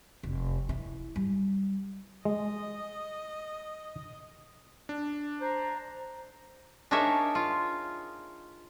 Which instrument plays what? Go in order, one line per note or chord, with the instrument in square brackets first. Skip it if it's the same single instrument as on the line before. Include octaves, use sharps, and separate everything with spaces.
[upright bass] F1
E4
G3
[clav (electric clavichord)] G#3 [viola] D#5
[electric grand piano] D4
[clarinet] C5 [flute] A#5
[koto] D4 D#4 G#4 A#4 C#5 E5
F4